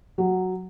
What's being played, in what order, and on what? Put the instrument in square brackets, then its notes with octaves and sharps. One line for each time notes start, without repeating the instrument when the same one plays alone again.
[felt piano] F#3